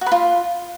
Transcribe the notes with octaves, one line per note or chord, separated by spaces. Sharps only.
F#4
B4
F4